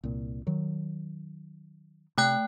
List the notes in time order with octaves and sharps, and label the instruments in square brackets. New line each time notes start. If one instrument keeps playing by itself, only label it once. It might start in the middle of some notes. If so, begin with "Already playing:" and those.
[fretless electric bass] C2 A#2
D#3 F#3
[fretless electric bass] C3 [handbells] A3 G5 F#6